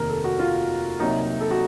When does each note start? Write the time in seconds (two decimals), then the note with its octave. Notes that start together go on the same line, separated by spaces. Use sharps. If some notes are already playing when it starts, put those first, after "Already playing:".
Already playing: F1 D#2 D#3 A#3 A#4
0.09 A4
0.24 F#4
0.39 F4
0.99 C2 C3 F#3 A#3 D#4
1.41 A4
1.51 F#4